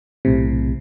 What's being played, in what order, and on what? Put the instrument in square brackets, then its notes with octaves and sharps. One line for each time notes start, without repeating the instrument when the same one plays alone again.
[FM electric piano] B1 A2 C3